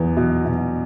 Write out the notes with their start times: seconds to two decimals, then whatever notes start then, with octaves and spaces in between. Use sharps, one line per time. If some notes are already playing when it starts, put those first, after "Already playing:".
Already playing: E2 B3
0.17 B2
0.45 B2